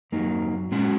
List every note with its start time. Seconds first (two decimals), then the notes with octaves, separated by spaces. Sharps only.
0.12 F#2 F#3 A#3 D#4
0.71 A#2 G#3 C#4 F#4